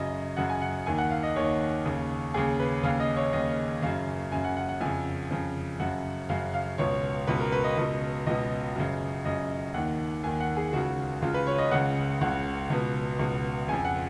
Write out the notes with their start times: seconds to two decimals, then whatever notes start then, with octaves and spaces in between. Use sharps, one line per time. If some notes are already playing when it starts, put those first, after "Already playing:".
Already playing: F#2 C#3 D#5
0.37 F#2 C#3 F#5
0.49 G#5
0.62 F#5
0.86 D#2 D#3 G#5
0.98 F#5
1.11 F5
1.23 D#5
1.36 D#2 D#3 C#5
1.85 D#2 C#3
2.34 D#2 C#3 G#4
2.60 B4
2.83 D#2 C#3 F5
3.00 D#5
3.16 C#5
3.32 D#2 C#3 D#5
3.82 F#2 C#3 F5
4.31 F#2 G#5
4.35 C#3
4.44 F#5
4.57 F#5
4.69 F#5
4.81 F2 C#3 G#5
5.31 F2 C#3
5.79 F#2 C#3 F#5
6.29 F#2 C#3 F5
6.54 F5
6.78 C#2 B2 C#5
7.27 C#2 B2 B4
7.40 A#4
7.52 B4
7.64 D#5
7.77 C#2 B2
8.26 C#2 B2 D#5
8.75 F#2 C#3
9.25 F#2 C#3 D#5
9.74 D#2 D#3 F#5
10.23 D#2 D#3 G#5
10.40 F#5
10.57 G#4
10.72 C#2 C#3 F#4
11.22 C#2 C#3 F4
11.34 B4
11.47 C#5
11.58 D#5
11.71 C#2 C#3 F#5
12.21 C#2 C#3 F#5
12.70 C#2 B2
13.19 C#2 B2
13.68 F2 C#3 G#5
13.85 F#5